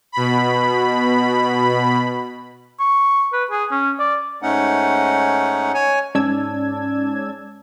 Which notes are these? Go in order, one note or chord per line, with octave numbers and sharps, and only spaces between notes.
B2 B5
C#6
B4
G#4
C#4
D5
G#2 A3 C#4 D#4 F#5
C#5 G#5
G#2 C#4 D5 A5 E6 G#6